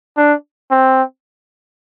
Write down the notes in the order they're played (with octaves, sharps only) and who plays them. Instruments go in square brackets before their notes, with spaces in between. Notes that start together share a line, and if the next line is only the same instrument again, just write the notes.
[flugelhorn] D4
C4